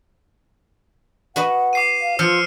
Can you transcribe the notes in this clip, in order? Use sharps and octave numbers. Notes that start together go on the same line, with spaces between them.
F#4 B4 D#5 F#5
D6 C7 D#7
F5
F3 F4 E6 F6 C#7